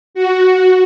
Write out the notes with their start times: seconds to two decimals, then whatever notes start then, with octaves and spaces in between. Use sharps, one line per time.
0.14 F#4